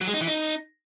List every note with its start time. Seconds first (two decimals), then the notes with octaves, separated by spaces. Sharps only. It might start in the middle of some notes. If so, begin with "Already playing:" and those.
0.01 F#3
0.08 G#3
0.14 D#4
0.21 E3
0.27 D#4